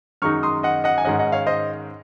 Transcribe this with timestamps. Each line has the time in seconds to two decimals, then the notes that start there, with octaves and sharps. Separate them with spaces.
0.22 F#2 D#3 G#3 D#4 C#6 F6
0.43 C6 D#6
0.63 D#5 F#5
0.84 D#5 F#5
0.98 G#5
1.05 G#2 D#3 G#3 C#4 D#5 F#5
1.19 D#5 F#5
1.32 C#5 F5
1.47 C5 D#5